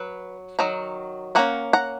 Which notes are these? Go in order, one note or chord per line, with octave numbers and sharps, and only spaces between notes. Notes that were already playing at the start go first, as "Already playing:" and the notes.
Already playing: F#3 B4
D#3 F#3 A#5
D#3 A#3 C#4 F#5 A#5
F#5 A#5